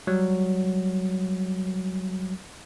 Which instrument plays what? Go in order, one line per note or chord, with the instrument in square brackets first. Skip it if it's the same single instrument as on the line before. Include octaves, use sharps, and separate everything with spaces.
[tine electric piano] F#3 G3